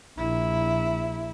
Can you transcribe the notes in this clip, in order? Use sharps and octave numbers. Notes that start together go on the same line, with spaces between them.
A#1 E4